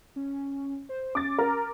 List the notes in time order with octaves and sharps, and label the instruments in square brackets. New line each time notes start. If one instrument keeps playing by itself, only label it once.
[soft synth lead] C#4
C5
[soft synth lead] C#4 [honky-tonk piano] D6 A6
[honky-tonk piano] A#4 A#5